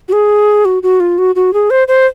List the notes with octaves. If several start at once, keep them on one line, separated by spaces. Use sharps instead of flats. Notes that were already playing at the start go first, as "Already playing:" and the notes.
F#4
G#4
F#4
F#4
F4
F#4
F#4
G#4
C5
C5